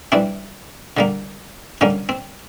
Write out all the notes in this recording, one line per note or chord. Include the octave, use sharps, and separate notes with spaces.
E3 G3 C4 D4
D3 G3 A#3
D3 G3 A#3 C#4
C4